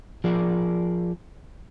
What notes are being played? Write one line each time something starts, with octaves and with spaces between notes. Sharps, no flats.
F3 G#4 A#4 D5